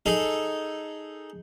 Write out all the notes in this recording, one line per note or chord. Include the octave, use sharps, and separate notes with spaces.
D#4 G#4 A4